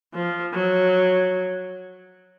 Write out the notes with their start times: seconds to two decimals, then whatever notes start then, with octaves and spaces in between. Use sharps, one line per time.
0.13 F3
0.54 F#3